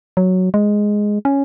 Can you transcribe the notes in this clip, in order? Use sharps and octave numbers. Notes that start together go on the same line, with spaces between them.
F#3
G#3
C#4